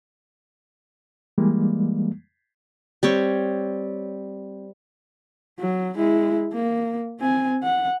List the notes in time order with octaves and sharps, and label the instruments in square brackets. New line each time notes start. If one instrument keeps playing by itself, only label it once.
[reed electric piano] E3 G3 G#3 A#3
[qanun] G3 C4 C#5
[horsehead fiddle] F#3
G#3 E4
A#3
C4 G#5
F#5